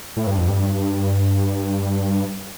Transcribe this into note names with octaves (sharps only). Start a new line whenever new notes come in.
A2
G2
F2
G2